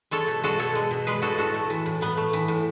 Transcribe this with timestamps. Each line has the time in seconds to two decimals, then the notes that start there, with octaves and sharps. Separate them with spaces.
0.11 G#3 A4 C#5
0.28 B2
0.44 G#3 F#4 A4
0.59 B2 A4 C#5
0.75 G#3
0.91 B2
1.07 G#3 G#4 B4
1.22 B2 F#4 A4
1.38 A2 F#4 A4
1.54 A3
1.70 E3
1.86 A2
2.01 A2 B3
2.17 A3
2.33 E3
2.48 A2